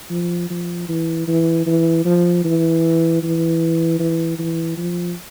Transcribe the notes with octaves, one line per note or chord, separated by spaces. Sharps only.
F3
F3
E3
E3
E3
F3
E3
E3
E3
E3
F3